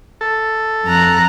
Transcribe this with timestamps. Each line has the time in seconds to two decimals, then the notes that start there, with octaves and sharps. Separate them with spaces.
0.21 A4
0.85 F2 A#5 F#6